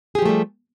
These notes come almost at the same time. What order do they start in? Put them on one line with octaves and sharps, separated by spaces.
G#4 G4 F3 A3 G3